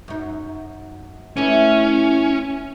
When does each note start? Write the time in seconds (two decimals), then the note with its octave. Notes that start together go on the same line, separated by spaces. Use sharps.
0.08 F#2 D#4
1.37 E3 A3 C#4 E4